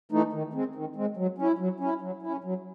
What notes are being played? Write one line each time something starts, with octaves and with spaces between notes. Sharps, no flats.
E3 A3 D#4
D#3
G#3 C4
D#3
G#3 C4
F#3
C#4 E4
F#3
C#4 E4
F#3
C#4 E4
F#3